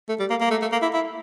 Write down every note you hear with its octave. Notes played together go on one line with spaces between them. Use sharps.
A3
G3
A#3
A#3
A3
A3
A#3
E4
E4